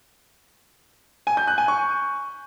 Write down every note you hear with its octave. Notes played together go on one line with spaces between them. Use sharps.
G#5
G6
F#6
G#5
C#6